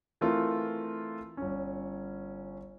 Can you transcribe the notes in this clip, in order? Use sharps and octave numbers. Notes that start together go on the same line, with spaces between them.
E3 A3 C4 F4 A#4
G1 C#4